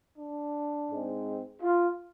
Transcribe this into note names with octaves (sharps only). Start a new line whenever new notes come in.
D4
G#2 G#3 C4
F4